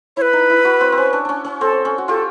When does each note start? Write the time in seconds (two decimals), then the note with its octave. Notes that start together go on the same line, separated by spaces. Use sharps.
0.17 E4 B4 C#5
0.33 D#4
0.50 E4
0.65 E4 F#4
0.81 C4
0.92 C4
0.97 C#4
1.13 D4
1.25 C#4 D4
1.45 C#4
1.61 C4 A4
1.85 C#4
1.98 F#4
2.08 F4 G4 A4